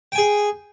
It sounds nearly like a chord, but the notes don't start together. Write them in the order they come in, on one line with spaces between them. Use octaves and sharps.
G5 G#5 G#4